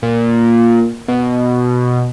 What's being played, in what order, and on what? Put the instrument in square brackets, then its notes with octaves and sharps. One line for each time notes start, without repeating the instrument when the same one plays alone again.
[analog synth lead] A#2
B2